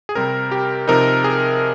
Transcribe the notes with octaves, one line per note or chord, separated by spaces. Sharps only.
G#4
C3 G3 C4 A#4
G4
C3 F3 C4 D#4 A#4
G#4